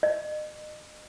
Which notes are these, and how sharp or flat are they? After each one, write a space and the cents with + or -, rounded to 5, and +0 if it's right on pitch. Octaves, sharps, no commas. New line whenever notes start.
D#5 -35